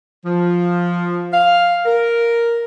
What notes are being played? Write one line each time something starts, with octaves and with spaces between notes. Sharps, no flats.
F3
F5
A#4